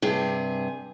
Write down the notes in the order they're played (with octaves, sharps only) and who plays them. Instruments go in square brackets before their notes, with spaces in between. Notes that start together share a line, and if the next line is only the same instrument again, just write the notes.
[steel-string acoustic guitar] G2 C3 G#4